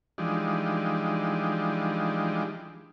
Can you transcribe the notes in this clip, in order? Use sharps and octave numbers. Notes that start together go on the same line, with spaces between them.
E3 F3 G3 G#3 D4 D#4